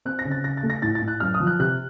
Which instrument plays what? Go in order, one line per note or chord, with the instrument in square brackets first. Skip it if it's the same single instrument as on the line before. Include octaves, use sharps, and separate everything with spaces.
[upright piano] C4 F#6
A#6
C#3
A6
C#3 A#6
A6
A3
A#6
A2 A6
A6
A2
F#6
F#2 F6
D#6
F3
F#6
C3 F#6